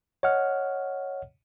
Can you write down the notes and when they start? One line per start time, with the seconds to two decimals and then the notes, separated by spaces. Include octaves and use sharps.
0.23 C#5 D#5 F#5 F6